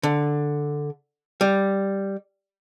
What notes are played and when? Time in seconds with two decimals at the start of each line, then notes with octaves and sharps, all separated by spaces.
0.03 D3
1.41 G3